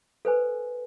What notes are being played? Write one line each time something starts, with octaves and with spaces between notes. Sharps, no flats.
A4 B4 C5 G#5